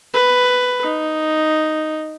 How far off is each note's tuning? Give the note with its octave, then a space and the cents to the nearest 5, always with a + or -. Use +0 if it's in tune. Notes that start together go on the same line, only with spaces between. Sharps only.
B4 +10
D#4 +0